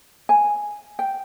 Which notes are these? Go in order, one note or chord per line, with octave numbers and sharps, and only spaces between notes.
G#5
G5